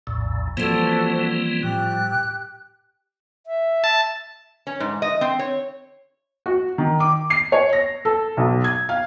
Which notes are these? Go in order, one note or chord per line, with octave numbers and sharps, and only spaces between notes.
A#1 E2 A2
E3 F3 G3 A#3 C4 F#4 A4 C5
A2 G4 F#6
E5
A5
C#4
G#2
D#5
C4
C#5
F#4
D#3
D6
C7
C#5
A#6
A4
B1
G#6
F5